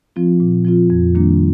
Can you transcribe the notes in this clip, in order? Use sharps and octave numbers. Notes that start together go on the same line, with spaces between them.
F3 C4 F4
A#2
F3 C4 F4
F2
D#3 G3 A#3 D4